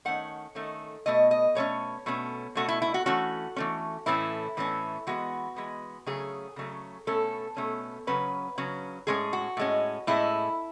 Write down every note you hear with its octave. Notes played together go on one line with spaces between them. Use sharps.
D#3 A3 C#4 F#5
D#3 A3 C#4
B2 A3 C#4 D#5
D#5
B2 A3 C#4 C#5
B2 A3 C#4
B2 A3 C#4 F#4
E4
E4
F#4
E3 A3 C#4 F#4
E3 A3 C#4
A2 E3 A3 C#4 E4
A2 E3 A3 C#4
E3 G#3 B3 F#4
E3 G#3 B3
C#3 F#3 A3 C#4 G#4
C#3 F#3 A3 C#4
B2 A3 C#4 A4
B2 A3 C#4
C#3 F#3 C#4 B4
C#3 F#3 C#4
A2 G#3 C#4 G#4
F#4
A2 G#3 C#4
A2 G#3 C#4 E4